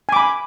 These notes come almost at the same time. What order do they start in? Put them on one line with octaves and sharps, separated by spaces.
G#5 D6 B5